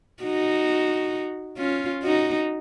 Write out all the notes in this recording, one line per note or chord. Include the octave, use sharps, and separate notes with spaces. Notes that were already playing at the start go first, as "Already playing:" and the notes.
D#4 F#4
C#4 F4
D#4 F#4